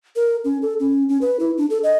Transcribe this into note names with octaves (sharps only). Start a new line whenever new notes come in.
A#4
C#4
A4
C#4
C#4
B4
E4
D4
A4
D#5